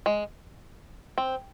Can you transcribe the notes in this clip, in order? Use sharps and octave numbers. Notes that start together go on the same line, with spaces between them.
G#3
C4